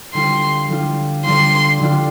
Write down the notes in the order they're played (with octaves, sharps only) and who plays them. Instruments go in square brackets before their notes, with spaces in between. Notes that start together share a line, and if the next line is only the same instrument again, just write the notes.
[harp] D3 G3 D4 F4 [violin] C6
[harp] D3 G3 D4 F4
[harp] D3 G3 D4 F4 [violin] C6
[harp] D3 G3 D4 F4